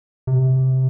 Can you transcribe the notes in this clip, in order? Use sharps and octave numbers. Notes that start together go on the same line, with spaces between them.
C3